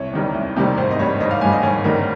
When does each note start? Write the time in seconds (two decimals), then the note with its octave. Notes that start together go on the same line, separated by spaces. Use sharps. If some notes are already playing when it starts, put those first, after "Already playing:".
Already playing: C2 C#5
0.14 C3 D#3 G3
0.34 C2
0.56 C3 D#3 G3
0.77 G#1 C5
0.91 D#5
0.99 G2 G3 C#5
1.20 G#1 D#5
1.31 F5
1.41 G2 G3 G#5
1.52 D#5
1.63 G#1 C#5
1.84 G2 D#3 G3 A#4